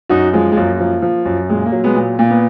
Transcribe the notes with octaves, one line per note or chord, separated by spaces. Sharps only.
F#2 D#4 F#4
F3 G#3
G#3
F#2 A#3
F3
F3
F#2
A#2 G#3
A#3
F#3
G#3 B3
A#2
A#2 A#3
B3